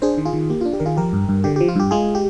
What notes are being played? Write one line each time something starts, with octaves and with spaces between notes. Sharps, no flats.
D4 G#4 C5
D#3
F4 G#4
D#3
A#3 G4
D4 F4
G4
D#3 A#4
F4 G#4
F3 G4 A#4
G2
G2
D3 G4
F3 G4
F4
G2 G4
G#3 F4 G#4
G4